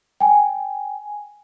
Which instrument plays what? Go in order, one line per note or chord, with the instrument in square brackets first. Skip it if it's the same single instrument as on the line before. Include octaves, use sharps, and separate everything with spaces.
[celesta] G5 G#5